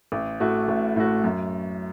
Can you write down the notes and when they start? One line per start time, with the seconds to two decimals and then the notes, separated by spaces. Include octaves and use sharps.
0.12 A1
0.40 A2 A3 F#4
0.68 A1
0.96 A2 A3 F#4
1.24 F#2